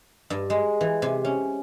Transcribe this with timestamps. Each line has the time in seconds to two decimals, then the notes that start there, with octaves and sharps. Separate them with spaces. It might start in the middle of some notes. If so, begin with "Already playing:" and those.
0.30 G2
0.50 G#3
0.81 E3
1.02 C3
1.25 C#4